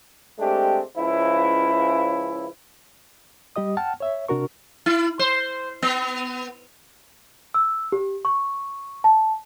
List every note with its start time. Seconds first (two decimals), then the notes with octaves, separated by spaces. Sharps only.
0.39 G#3 A3 C4 D4 G4
0.97 C#2 F3 C#4 E4
3.56 G3 G4 D#5 D#6
3.77 F#5 G5 A5 F6
4.00 C#5 E5
4.28 C3 D4 F#4 A#4 C#6
4.86 E4
5.19 C5
5.82 B3
7.54 E6
7.92 G4
8.25 C#6
9.04 A5